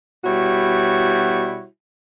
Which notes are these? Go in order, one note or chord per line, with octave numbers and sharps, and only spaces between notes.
B2 G3 E4 F#4 C#5